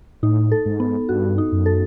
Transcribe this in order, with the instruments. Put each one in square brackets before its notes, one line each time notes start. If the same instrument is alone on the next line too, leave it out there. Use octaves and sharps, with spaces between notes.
[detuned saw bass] A2 [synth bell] D#4
[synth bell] A4
[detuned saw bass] G#2
[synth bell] B3
[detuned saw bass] G2 [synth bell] F#4
[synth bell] D#4
[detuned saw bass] F#2
[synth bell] A4